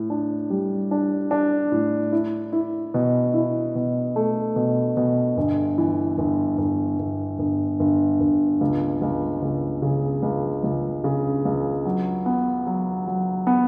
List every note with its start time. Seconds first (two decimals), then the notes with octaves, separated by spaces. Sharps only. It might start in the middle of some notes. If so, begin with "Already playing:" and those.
Already playing: A2
0.10 D4
0.50 G3
0.91 D4
1.31 D4
1.72 A2
2.12 E4
2.52 E4
2.94 B2
3.34 E4
3.75 B2
4.16 A3
4.56 B2
4.97 B2
5.37 G1
5.78 E3
6.18 G1
6.58 G1
6.99 G1
7.39 G1
7.80 G1
8.20 G1
8.61 C#2
9.02 C#2
9.42 C#2
9.82 C#3
10.23 C#2
10.64 C#2
11.04 C#3
11.45 C#2
11.85 F#3
12.26 B3
12.67 F#3
13.07 F#3
13.47 B3